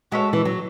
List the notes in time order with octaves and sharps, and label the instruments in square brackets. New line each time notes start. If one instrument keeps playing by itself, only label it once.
[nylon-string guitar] G#3 [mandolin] F#4 A4 C#5 E5
[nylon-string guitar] E3
F#3